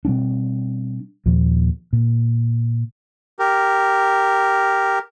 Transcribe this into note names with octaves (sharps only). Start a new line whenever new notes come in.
B2 G3 C4 D4
D#2 A#2 F3
A#2
G4 A#4